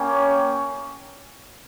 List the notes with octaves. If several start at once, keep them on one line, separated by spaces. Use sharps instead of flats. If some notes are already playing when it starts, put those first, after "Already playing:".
Already playing: A#3 C#4 G4 C#5